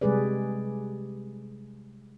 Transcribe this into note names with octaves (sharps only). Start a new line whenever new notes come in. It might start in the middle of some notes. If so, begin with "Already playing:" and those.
C3 G3 G#3 G#4 B4 D5